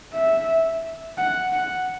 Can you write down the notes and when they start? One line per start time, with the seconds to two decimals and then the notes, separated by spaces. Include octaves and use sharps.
0.13 E5
1.17 F#5
1.53 F#5